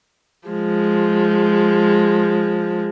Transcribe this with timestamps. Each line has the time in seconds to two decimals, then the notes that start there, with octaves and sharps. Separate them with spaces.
0.48 F3 G#3